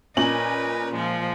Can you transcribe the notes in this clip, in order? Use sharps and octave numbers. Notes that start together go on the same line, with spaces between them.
A#2 C#4 A#4 B4 D#5 F#7
A#2 F3 G#3